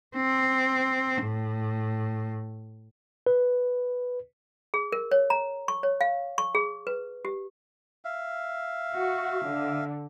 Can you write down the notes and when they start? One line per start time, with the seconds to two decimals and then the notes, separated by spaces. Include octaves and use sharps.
0.15 C4
1.23 A2
3.27 B4
4.74 G#4
4.92 A#4
5.11 C#5
5.30 A#5
5.68 C#6
5.83 C#5
6.01 F5
6.38 C#6
6.55 G#4
6.87 B4
7.25 G4
8.05 E5 F5
8.94 F#4
9.47 D3